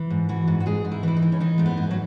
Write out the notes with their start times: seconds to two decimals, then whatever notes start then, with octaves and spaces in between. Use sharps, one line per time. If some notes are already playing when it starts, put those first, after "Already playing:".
Already playing: E3
0.10 G#2
0.29 E3 F#4
0.47 G#2
0.60 F#4
0.66 G#2 G#4
0.85 G#2
0.92 E4
1.03 E3 E4
1.16 D#4
1.22 E3
1.32 C#4
1.40 E3 D#4
1.58 G#2 A3
1.66 B3
1.77 G#2
1.91 F#3